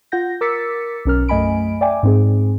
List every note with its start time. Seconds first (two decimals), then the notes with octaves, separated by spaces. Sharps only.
0.12 F4 F#5 G6 A#6
0.41 A#4 D6 E6 A6 B6 C#7
1.05 B1 C#4 A#4 F6
1.28 F#2 A3 D#5 G#5 B5 D7
1.81 D5 E5 G5 G#5 D6
2.03 G#2 C4 G#4